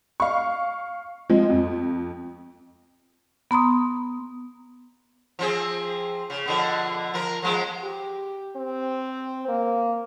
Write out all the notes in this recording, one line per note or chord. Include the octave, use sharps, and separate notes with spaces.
F5 C#6
F3 G#3 C4
F2
B3 A#5 C6 D#6
F3 C4 G#4
C#3
B2 D3 F3
F3 A#4
F3 G#3 B3
G4
C4
A#3